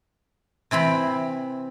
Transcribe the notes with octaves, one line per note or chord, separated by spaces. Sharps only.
C3 E3 C4 B5